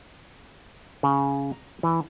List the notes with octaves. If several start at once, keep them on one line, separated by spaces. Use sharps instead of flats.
C#3
A#5
E3